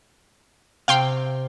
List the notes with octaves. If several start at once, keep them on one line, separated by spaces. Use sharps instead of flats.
C3 F5 G5 C6